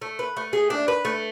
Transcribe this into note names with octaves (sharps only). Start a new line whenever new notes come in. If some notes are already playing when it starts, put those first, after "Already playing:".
A3
B4
A3
G#4
D4
B4
A3